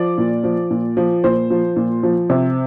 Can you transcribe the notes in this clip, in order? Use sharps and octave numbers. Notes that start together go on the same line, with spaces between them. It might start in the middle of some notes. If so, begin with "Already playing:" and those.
Already playing: F3 D5
A#2
F3
A#2
F3
A#2 C5
F3
A#2
F3
C3